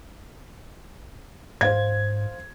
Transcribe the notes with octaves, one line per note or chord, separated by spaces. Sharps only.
G#2 C5 F5 G#6